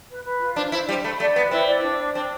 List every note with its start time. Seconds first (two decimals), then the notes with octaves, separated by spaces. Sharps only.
0.10 B4
0.24 B4
0.40 F4
0.56 D4 C5
0.72 E4 C5
0.89 G3 C5
1.04 A3 B5
1.20 A3 D5
1.35 B3 B4
1.51 C4 E4
1.67 D5
1.83 D4
1.98 D5
2.14 C4 D4